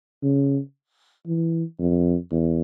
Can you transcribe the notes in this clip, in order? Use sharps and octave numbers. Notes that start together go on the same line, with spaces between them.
C#3
E3
F2
E2